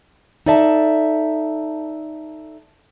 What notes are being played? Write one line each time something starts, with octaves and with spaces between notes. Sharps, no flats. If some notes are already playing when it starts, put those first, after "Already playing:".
D#4 A4 D5 E5 A5